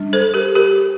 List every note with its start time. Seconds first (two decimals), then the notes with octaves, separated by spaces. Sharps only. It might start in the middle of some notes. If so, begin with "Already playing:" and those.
Already playing: G3 D4
0.13 A4 C5
0.34 G4 A#4
0.55 G4 A#4